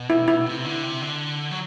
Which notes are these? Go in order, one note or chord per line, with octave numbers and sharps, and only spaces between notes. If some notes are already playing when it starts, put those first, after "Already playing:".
Already playing: B2
E4
E4
C3
D3
C3
D3
F#3